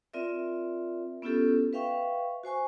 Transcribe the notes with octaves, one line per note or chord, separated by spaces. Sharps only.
C4 F4 A#4 D5 E5
B3 C#4 E4 F4 G4 A4
B4 E5 F5 G5 C#6
F#4 C5 G#5 C#6